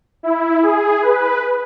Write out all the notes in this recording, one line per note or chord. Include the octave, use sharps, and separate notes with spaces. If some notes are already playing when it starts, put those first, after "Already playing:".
E4
G#4
B4